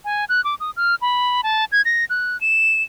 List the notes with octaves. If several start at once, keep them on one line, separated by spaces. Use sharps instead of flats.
G#5
F#6
D6
D#6
F6
B5
A5
G#6
A#6
F#6
E7